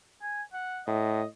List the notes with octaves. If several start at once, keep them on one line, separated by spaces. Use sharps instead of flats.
G#5
F#5
A2 D#5